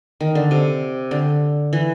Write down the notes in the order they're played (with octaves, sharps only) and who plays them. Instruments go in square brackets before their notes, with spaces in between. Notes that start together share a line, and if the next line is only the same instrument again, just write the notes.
[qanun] D#3
D3
C3
D3
E3